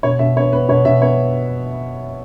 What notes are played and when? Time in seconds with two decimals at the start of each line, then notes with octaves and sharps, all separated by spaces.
0.03 B2 C#5
0.19 B2 E5
0.36 B3 C#5
0.53 B3 B4
0.69 B2 C#5
0.85 B2 E5
1.02 B3 C#5